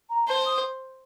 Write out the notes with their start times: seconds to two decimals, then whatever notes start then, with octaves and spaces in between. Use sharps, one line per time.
0.09 A#5
0.27 C5 A5
0.45 D#6